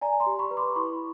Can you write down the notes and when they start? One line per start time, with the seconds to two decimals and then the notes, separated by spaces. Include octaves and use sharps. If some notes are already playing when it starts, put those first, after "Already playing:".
0.01 D5 G#5 A#5
0.20 A#5 C6
0.26 G4
0.39 B5 C#6
0.51 B4
0.57 C6 D6
0.76 E4 B5 C#6